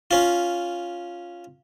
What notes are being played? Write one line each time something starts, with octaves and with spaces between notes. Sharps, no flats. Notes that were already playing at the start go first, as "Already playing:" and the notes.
C#4 F4